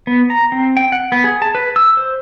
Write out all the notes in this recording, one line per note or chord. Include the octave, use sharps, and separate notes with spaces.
B3
A#5
C4
G5
F#5
B3
G#4
A5
B4
E6
C5